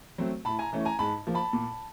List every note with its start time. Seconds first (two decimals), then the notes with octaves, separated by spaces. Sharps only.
0.18 F#3 A3 C4
0.45 A2 A5 B5
0.59 G#5 A#5
0.73 E3 A3 C#4
0.85 G#5 A#5
0.99 G#2 A5 B5
1.27 F3 A#3
1.35 A5 B5
1.53 A#2